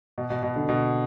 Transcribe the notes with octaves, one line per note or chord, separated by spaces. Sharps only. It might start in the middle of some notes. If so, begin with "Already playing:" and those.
B2
B2
B2
D3
B2